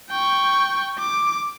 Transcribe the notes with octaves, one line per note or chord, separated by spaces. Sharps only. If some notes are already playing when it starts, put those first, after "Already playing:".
G5 C#6
D6